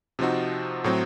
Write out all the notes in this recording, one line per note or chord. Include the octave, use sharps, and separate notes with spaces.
C3 F3 C4 D#4 F#4
A2 F#3 C4